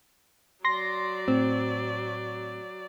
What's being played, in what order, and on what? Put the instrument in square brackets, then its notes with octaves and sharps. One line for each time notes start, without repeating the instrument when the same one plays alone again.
[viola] F#3 D5 [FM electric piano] C6 A#6
[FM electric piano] A2 [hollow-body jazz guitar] C4